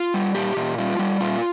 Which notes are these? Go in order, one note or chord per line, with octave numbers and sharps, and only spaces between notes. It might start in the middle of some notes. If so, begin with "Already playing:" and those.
Already playing: F4
G3
A#2 G4
A#2
G3 F4
G3
A#2 F4